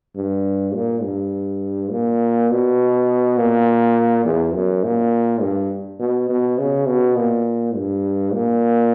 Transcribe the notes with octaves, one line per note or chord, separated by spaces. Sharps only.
G2
A#2
G2
A#2
B2
A#2
E2
F#2
A#2
G2
B2
B2
C#3
B2
A#2
G2
A#2